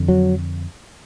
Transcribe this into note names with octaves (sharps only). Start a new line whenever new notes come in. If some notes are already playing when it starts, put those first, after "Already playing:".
Already playing: F2 D3
F#3